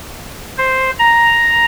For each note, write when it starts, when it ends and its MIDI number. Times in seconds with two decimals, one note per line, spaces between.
0.58 0.91 72
0.99 1.66 82